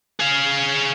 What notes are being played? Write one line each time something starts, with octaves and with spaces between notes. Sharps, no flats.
G#4 F5